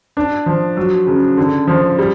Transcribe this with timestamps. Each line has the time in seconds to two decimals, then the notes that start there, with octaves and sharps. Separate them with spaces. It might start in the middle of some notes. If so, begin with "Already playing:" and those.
0.17 D4
0.46 F3
0.77 F#3
1.07 C#3
1.37 D3
1.67 F3
1.99 G3